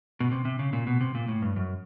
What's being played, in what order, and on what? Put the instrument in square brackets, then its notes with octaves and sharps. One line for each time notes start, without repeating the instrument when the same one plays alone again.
[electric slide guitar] B2
C3
C3
C#3
A#2
B2
C3
A#2
A2
G2
F#2